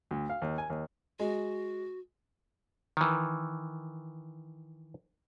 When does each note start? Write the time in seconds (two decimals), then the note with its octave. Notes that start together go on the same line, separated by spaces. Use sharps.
0.11 D2
0.29 F5
0.42 D#2
0.58 G#5
0.70 D#2
1.20 G#3 F#4
2.97 D#3 E3